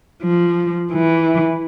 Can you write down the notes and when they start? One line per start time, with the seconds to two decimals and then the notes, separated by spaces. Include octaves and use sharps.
0.23 F3
0.91 E3